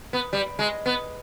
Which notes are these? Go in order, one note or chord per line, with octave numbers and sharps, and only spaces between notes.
B3
G3
G#3
B3